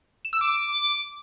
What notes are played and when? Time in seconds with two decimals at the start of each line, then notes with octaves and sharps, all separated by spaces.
0.25 E7
0.33 E6
0.41 D6